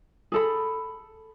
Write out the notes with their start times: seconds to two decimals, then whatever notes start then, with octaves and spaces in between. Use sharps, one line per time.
0.32 G#4 A4 B5